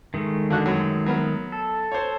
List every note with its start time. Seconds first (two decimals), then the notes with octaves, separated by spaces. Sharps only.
0.14 D#3 G#3 A3
0.50 D3 F#4 F#6
0.66 F#2 F#3
1.06 F#3 B3 A#4
1.52 A4
1.92 C5 C#5